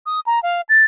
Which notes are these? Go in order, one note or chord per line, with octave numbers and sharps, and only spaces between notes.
D#6
A#5
F5
A6